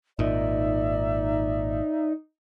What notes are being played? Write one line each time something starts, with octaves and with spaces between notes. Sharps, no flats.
G#1 A#2 D#4 D5 E5